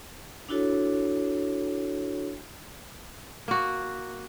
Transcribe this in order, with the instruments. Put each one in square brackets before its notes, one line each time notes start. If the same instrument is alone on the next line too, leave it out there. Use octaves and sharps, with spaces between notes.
[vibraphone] D4 E4 F#4 A4 C#5
[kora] A#3 F#4